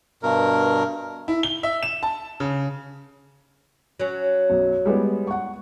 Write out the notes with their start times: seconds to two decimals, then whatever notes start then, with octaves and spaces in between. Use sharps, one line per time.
0.23 G2 B2 A#4
1.28 E4
1.43 G7
1.63 E5
1.83 E7
2.03 A5
2.40 C#3
4.00 F#3 C#4
4.50 B1 F#2
4.85 G3 G#3 B3
5.27 F#5 C#6